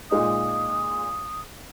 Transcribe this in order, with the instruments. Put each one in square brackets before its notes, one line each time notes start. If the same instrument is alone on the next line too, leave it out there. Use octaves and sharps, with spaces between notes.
[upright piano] A#2 G#3 D#4 [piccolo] D#6